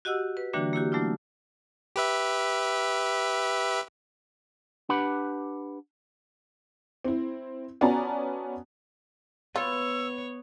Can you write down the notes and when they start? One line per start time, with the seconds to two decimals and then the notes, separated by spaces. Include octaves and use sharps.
0.05 F#4 G4 D#5 F#5 E6
0.37 B4
0.53 D3 E3 G3 A#3 D4 F#4
0.73 A#3 E4 F#4 G4
0.92 F#3 A3 B3 D4 E4 F4
1.96 G4 B4 E5
4.89 D4 G4 B4 F#5 B5
7.05 C4 E4
7.81 B3 C#4 F#4 D5 A5 A#5
9.56 B3 F4 C#5 E6